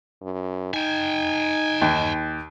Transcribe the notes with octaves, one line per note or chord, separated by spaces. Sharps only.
F#2
D#4 G5 G#5
D#2